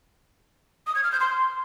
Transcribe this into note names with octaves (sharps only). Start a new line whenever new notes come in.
D#6
G#6
F6
G6
C6